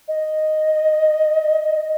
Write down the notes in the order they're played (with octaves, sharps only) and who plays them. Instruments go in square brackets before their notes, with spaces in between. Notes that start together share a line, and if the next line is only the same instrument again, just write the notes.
[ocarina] D#5